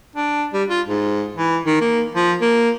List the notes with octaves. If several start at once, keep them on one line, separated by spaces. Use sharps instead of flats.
D4
G3
F4
G#2
E3
D#3
A#3
F3
A#3